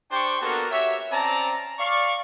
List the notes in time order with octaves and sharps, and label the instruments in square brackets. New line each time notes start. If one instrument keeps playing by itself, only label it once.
[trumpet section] D4 G4 C5 G5 C6 C#6
A#3 B3 D4 F#4 A4 A#4
F#4 G4 C#5 E5
C4 C#4 D5 A5 A#5
D5 F5 C#6